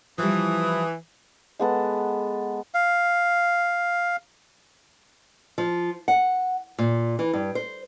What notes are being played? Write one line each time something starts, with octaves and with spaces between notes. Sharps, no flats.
E3 F3 G3 D#6
G#3 B3 A4 F#5
F5
F3
F#5
A#2
E3
G2
C5